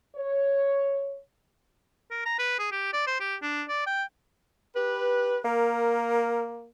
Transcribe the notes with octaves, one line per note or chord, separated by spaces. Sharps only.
C#5
A#4
A#5
B4
G#4
G4
D5
C5
G4
D4
D5
G5
G4 B4
A#3 A#4